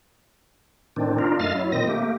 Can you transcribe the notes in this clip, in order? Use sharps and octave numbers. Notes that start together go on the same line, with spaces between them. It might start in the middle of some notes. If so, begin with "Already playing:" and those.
A2 D#3 C4 D4
D4 D#4 F4 A#4
F#2 A3 D#5 F5 F6 A6
F#3 E4
A#2 D#3 C4 D#5 A#6
A3 A#3 G4